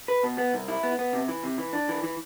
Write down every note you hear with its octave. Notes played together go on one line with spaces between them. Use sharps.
B4
B2
B3
C2
E4
B3
B3
C3
E3
C3
E3
D4
E3
E3